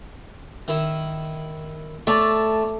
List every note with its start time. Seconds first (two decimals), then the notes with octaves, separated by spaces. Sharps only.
0.68 D#3 E4
2.07 A3 C#5 D5 A5